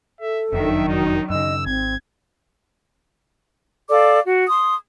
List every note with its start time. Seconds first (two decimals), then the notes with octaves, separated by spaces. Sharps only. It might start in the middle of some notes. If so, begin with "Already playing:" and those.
0.20 A4 E5
0.53 F#1 F2 D#3 F#3 D4 E5
0.88 D#4 F#4
1.30 F#2 C#3 D#5 E6
1.66 G#1 C4 G#6
3.90 A4 D5 F5 D6
4.25 F#4
4.49 C6 D#6